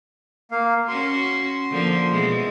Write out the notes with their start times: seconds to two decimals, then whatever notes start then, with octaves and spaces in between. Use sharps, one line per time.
0.51 A#3 F5
0.88 C#4 F#4 C6
1.71 D3 F3 A#3
2.11 B2 E3 G#3